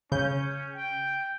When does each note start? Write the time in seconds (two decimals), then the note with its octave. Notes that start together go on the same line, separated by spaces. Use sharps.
0.12 C#3 C#4 G6
0.75 G5